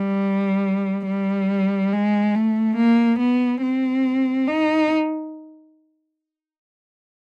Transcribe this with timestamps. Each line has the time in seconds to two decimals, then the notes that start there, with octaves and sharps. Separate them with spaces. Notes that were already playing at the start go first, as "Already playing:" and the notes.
Already playing: G3
1.06 G3
1.92 G#3
2.35 A3
2.77 A#3
3.19 B3
3.62 C4
4.47 D#4